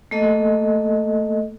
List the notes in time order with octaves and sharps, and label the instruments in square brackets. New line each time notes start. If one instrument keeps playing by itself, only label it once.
[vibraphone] A3 A#3 A4 D#5